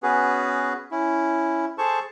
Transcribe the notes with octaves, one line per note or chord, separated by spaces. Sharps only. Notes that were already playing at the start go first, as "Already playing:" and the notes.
B3 C#4 F#4 G#4 B4
C#4 E4
G#4 A4 C5 A5 C#6